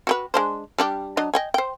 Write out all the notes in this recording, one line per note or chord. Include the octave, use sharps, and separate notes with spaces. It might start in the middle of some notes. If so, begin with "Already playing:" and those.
F#4 G4 B4
G#3 D4 C5
G3 D4 G4
F#3 D4 D#5
D#5 G5 G#5
C5 G5